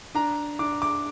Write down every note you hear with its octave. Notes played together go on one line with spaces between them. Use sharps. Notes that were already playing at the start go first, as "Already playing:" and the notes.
D4 A#5
D4 D6
D6